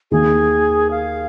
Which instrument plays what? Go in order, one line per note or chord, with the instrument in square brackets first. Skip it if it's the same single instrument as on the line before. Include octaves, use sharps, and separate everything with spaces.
[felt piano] D#2 D#3 A#3 [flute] G#4
[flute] F5